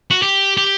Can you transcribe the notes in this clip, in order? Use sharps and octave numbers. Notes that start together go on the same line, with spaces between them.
F#4
G4
G4